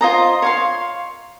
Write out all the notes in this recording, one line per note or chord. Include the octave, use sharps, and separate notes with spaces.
F4 C5 D#5 A#5
C#5 F5 C6